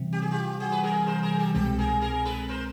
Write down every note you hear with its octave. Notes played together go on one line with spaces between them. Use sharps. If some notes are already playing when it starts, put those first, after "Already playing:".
Already playing: C3 E3 G3
G4
G#4
F4 G4
F#4 G#4
B4
G#4 A#4
A#4 C5
G#4 A#4
G4 A4
C2 B2 G#3 C4 G4 A4
G#4 A#4
G#4 A#4
A#4
A4 B4
A#4 C5